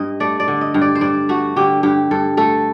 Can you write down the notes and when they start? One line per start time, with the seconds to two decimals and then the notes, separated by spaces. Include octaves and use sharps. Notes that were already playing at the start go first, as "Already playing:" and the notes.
Already playing: G2 D#5
0.20 A3 D5
0.40 D5
0.48 D3
0.61 D#5
0.74 G2
0.81 D5
0.95 C5
1.01 G2 D5
1.29 A3 F#4
1.56 D3 G4
1.83 G2 G4
2.11 G2 A4
2.37 A3 A4